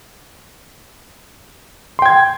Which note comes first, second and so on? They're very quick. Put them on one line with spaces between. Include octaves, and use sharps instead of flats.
C6 G5 G#6